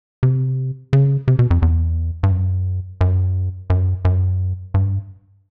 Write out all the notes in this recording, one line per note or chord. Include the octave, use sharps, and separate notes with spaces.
C3
C#3
C3
B2
F2
E2
G2
F#2
F#2
F#2
F#2
G2